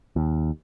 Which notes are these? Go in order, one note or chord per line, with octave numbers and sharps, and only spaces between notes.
D#2